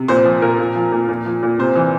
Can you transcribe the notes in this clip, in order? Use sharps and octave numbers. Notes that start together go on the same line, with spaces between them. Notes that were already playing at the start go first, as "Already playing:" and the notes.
Already playing: C3
A#2 C5
F3
A#2 A#4
A#2
F3
A#2
A#2
F3
A#2
C3 C5
E3